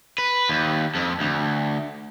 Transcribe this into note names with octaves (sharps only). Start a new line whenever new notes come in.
B4
D#2
F2
D2